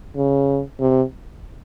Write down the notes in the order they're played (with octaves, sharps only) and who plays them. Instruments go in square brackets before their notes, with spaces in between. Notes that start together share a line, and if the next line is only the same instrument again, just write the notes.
[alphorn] C#3
C3